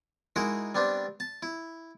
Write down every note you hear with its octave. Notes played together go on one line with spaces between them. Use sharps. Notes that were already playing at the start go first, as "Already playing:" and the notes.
G#3 D#4 E4 F#4 A#4
G3 B3 C4 D4
A5
E4